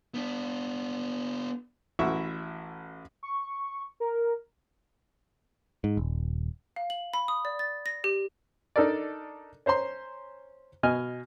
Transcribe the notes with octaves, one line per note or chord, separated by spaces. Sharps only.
B3 D4
A1 E4 F#4 E5 C#6
C#6
A#4
G#2
D#1
F5
F#7
B5
D#6
D5
A6
A#6
G4
D4 D#4 A4 A#4 D5
C#4 C5 A#5 C6
B2 D#5 G#5 F6